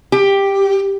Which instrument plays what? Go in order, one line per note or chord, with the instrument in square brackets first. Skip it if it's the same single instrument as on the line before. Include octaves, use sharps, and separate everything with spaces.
[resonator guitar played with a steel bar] G4